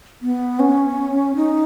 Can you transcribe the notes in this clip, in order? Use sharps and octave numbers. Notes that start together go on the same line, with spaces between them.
B3
C#4
D#4